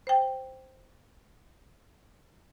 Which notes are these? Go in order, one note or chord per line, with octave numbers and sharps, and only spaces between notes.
C5 G5